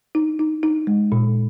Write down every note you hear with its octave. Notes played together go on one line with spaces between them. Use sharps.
D#4
D#4
D#4
G#3
A#2